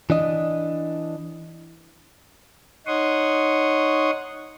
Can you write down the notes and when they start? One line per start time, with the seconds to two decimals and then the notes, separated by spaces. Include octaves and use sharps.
0.10 E3 D4 D#5
2.87 D#4 C#5 F#5 C6 C#6 D#6